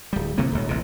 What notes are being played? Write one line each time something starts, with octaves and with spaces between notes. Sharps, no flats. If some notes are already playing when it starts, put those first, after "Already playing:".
D1 G3
C3 D#3 E3 A#3
D#1 C#2
A1 C3